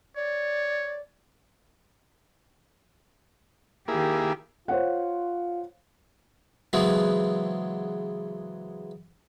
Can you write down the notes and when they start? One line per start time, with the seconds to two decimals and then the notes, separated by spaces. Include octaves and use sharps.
0.16 C#5 D5
3.88 D#3 A#3 E4 G4 G#4
4.68 F4 C5 C#5 F#5
6.73 C#3 E3 F#3 G#3 B3 C4